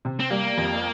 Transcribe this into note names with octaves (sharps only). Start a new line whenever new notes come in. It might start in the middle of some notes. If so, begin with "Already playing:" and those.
C3
C4
G3 A#3
F2